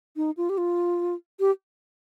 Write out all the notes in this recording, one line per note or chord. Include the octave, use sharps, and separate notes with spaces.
D#4
F4
G4
F4
G4